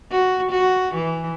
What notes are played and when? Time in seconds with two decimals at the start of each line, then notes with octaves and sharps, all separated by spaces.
0.11 F#4
0.51 F#4
0.94 E3